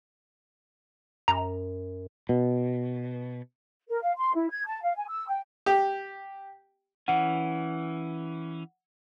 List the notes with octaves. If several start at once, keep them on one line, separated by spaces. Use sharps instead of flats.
F#2 A#5
B2
A#4
F5
C6
E4
G#6
A5
F5
G#5
E6
G5
G4
E3 C#4 F#5